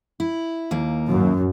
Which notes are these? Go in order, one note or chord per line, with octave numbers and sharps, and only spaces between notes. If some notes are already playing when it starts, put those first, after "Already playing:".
E4
D#2 A#3
F#2